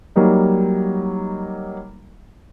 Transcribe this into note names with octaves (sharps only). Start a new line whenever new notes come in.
F#3 G3 A#3 D#4